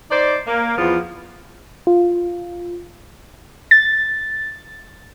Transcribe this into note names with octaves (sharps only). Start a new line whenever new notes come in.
D#4 C5 D5
A#3
E2 F3 B3 F4
F4
A6